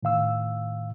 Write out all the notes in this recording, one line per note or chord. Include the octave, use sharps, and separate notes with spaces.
A2 D#3 F5 E6